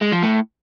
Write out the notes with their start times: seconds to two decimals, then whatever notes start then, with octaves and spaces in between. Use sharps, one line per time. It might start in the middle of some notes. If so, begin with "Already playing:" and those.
0.01 G#3
0.12 F3
0.23 A2